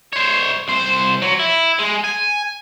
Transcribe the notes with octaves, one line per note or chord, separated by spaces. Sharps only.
C5 C#5
C2 C5
F#3
E4
G#3
G#5